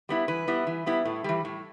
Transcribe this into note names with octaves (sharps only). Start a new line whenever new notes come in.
G3 B3 E4
E3 B4
G3 B3 E4
E3
G3 B3 E4
A2
E3 G3
A2